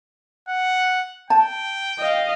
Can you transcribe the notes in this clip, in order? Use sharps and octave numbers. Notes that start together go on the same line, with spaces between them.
F#5
G5 A5
D#5 F5